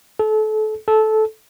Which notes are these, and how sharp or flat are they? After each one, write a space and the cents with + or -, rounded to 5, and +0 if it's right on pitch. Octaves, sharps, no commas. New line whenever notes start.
A4 -30
A4 -15